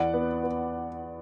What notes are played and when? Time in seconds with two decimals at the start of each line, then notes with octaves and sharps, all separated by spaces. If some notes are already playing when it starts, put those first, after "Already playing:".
Already playing: E2 D5 F#5
0.14 B3
0.43 B3